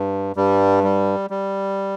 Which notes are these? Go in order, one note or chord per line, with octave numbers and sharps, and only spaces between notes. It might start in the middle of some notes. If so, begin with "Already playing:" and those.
Already playing: G2
G2 G3
G3
G3